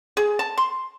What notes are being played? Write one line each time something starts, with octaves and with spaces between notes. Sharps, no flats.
G#4
A5
C6